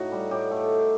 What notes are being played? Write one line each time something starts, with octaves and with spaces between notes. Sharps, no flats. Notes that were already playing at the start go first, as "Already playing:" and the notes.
Already playing: A2 D#4 F#4
G3
A2 G4
A3